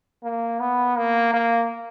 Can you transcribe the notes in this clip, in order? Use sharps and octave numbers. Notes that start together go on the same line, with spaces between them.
A#3
B3
A#3
A#3